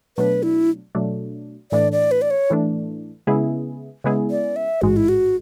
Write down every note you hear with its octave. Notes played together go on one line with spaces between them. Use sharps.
B2 F#3 A3 D4 B4
E4
B2 F#3 A3 D4
A2 E3 A3 D4 D5
D5
B4
D5
C#5
A2 E3 A3 D4
C#3 G#3 B3 E4 G#4
C#3 G#3 B3 E4 G#4
D5
E5
A1 G#2 G#3 F#4
E4
F#4